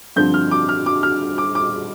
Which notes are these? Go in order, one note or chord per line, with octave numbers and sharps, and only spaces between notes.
G2 D3 F3 C4 G6
F6
D6
F6
D6
F6
D6
D6